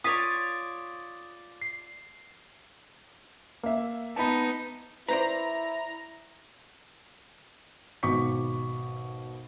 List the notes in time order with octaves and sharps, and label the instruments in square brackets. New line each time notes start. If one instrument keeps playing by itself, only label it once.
[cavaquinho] F4 C#5 D5 [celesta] D#6 B6 D#7
[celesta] C7
[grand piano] A#3 E5
[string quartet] B3 D#4 [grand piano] A5 B5
[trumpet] E4 [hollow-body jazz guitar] B4 C5 D5 [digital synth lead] A#5
[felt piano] G#1 B2 C#6 D6 B6